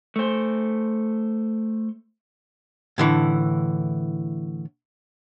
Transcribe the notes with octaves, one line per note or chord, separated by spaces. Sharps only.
A3 C5
A2 D3 E3